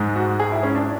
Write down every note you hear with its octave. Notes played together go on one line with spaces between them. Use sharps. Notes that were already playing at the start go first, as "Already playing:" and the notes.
Already playing: G#2 G#3
F#4
G#4
E4
C#4
D4